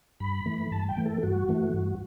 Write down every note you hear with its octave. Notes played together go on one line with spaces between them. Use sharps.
G2 B5
E3 A3
B5
G2 A5
G5
E3 A3
A4
G2 F#4
E3 A3
G2